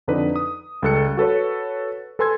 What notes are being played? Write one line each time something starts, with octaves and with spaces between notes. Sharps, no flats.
F2 D3 D#4 B4 D5
D#6
C#2 G3 A4 F#6 C#7
F#4 A4 B4 C#5
A4 B4 G#5 C6 E6 G#6